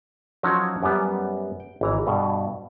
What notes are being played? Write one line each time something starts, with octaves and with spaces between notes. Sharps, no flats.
F3 F#3 C#4 D#4 F#4
F#2 G3 B3
G5
G#1 E3 A#5
G2 B2